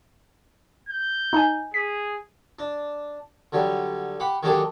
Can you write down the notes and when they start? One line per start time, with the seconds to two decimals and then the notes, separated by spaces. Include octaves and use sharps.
0.89 G6
1.33 D#4 G#5
1.74 G#4 B6
2.59 D4
3.52 D3 F#3 G3
4.20 G4 F#5 B5
4.43 D#3 F#3 G#3 D4 G4 A4